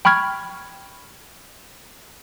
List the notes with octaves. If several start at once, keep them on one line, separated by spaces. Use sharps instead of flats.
G5 B5 C#6 F6 G#6